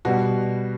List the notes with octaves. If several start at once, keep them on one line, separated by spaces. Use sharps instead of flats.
B2 G3 F#4